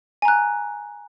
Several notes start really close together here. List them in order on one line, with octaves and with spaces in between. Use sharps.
G#5 A#5 F#6